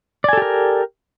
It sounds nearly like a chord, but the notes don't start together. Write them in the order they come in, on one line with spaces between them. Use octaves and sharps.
D5 G#5 A4 G4 A#4